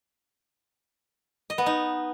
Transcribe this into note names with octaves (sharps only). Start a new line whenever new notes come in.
D#5
B3
D#4